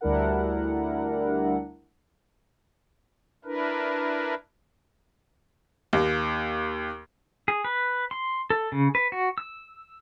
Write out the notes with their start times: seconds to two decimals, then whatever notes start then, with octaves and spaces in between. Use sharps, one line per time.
0.01 D2 G3 D4 E4 A#4 F#5
3.45 D4 E4 A#4 B4
5.93 D#2
7.48 G#4
7.65 B4
8.11 C6
8.50 A4
8.72 C#3
8.95 B4
9.12 F#4
9.38 E6